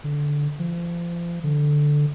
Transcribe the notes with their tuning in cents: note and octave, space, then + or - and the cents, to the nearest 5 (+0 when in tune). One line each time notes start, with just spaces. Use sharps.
D3 -10
F3 -30
D3 +0